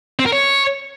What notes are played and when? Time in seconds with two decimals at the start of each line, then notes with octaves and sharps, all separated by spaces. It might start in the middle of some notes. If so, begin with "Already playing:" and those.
0.19 C4
0.26 A#4
0.32 C#5